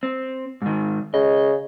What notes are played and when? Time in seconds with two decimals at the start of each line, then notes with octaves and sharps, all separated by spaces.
0.03 C4
0.62 G#2 D#3
1.14 C#3 D#5